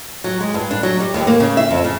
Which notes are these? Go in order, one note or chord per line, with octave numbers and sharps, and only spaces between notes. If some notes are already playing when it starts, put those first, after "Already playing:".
F#3
G#3
G2
D4
F#3
G3
D#2
A#3
C#3
E5
F2
C#3